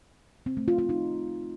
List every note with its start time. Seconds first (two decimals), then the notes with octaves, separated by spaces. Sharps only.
0.46 C4
0.57 A3
0.68 F4
0.78 F4
0.89 D#4